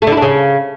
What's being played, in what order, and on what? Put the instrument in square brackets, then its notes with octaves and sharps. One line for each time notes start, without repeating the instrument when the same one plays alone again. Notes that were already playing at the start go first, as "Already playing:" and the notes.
[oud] A3
D3
E4
D4
C#3